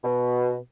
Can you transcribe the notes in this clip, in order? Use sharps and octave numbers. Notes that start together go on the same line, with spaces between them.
B2